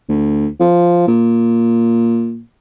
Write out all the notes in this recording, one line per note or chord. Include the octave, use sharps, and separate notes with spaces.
D2
F3
A#2